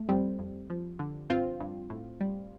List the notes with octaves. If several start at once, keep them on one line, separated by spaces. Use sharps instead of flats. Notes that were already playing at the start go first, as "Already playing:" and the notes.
Already playing: A3
F2 G3 C4
F2
F3
D3
G2 C4 F4
G2
A2
G3